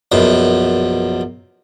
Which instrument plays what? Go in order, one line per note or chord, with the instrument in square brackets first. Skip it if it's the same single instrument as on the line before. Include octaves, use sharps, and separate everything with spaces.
[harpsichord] A#1 F#2 B2